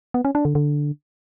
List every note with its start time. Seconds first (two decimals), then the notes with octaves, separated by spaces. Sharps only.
0.14 B3
0.25 C#4
0.35 D4
0.45 D3
0.55 D3